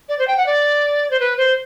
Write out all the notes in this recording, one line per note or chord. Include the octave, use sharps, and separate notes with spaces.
D5
C5
G5
F#5
D5
C5
B4
C5